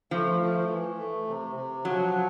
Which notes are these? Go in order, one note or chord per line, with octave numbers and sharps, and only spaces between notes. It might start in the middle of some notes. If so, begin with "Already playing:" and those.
F3 A3
A3
E3
A3
C3
C3
F3 F#3